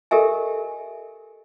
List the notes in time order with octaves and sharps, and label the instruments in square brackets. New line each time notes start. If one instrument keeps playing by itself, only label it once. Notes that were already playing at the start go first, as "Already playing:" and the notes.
[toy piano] G4 A4 A#4 D#5 E5 G#5